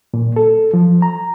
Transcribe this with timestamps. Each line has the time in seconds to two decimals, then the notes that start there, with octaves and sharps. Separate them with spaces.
0.14 A#2
0.36 A4
0.74 F3
1.02 A#5